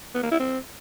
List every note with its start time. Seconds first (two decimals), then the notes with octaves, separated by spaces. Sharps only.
0.15 B3
0.23 A#3
0.31 E4
0.40 C4